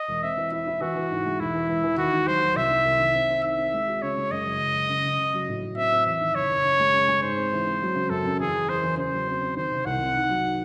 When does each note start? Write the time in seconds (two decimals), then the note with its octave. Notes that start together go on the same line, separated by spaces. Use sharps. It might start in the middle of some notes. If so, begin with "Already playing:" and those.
Already playing: D#5
0.08 E1
0.23 C4 E5
0.37 E3
0.52 E4 E5
0.67 E4
0.81 E3 F#4
0.96 E3
1.10 G#2
1.26 G#3
1.39 E1 E4
1.55 E3
1.69 E3
1.83 E3
1.97 D#2 F#4
2.12 D#3
2.27 F#3 C5
2.42 F#3
2.56 C2 E5
2.70 D#3
2.85 C2
2.99 D#3
3.15 C4
3.30 C4
3.43 D#4 E5
3.58 C4
3.73 G#3
3.88 F#4
4.02 C#3 C#5
4.17 G#3
4.31 F#2 D#5
4.46 F#1
4.60 F#1
4.75 F#1
4.89 C#3
5.05 C#3
5.19 C#3
5.34 F#3
5.48 A2
5.62 A2
5.77 C4 E5
5.92 C4
6.06 E2 E5
6.21 D#3
6.35 F#1 C#5
6.50 F#1
6.65 C#4
6.80 G#3
6.93 C#4
7.08 G#3
7.22 G#2 C5
7.37 C4
7.52 E3
7.66 C4
7.82 F#3
7.95 C#3
8.10 F#2 A4
8.25 F#2
8.40 E2 G#4
8.54 E2
8.68 E2 C5
8.83 E2
8.97 C#3 C5
9.13 F#3
9.28 C4
9.42 C4
9.56 D#3 C5
9.71 C3
9.86 C2 F#5
10.00 C3
10.14 D#4
10.29 F#3
10.44 D#4